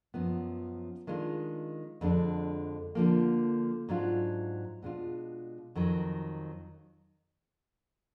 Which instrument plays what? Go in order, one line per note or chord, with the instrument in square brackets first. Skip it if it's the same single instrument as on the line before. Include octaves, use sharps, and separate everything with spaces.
[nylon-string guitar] F#2 F3 B3
D#3 G#3 D4 F4
F2 D3 G#3 D4
D3 F3 A#3
G#2 F#3 D4 F4
B2 G#3 D4 F4
F2 D#3 F#3